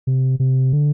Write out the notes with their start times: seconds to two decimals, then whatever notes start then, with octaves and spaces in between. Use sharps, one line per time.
0.07 C3
0.40 C3
0.73 D3